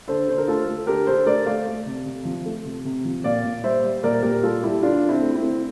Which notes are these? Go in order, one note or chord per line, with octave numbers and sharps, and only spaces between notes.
D3 A4 C5
D3 C5
A#4
A3 F4 A4
A3
D3 G4 A#4
D3 A4 C5
A3 A#4 D5
A3 D5 F5
A3
C3
C3
F3
A3
C3
C3
F3
A#2 D5 F5
A#2
G3 C5 E5
G3
A#2 A#4 D5
A#2 G4 A#4
G3 F4 A4
G3 E4 G4
D3 D4 F4
D3
C4 E4
A3
C4 E4
A3